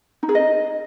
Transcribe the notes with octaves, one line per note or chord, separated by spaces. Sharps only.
D#4
G#4
D#5